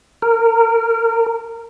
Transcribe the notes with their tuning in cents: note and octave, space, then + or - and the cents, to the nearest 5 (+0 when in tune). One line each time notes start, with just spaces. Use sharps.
A#4 -20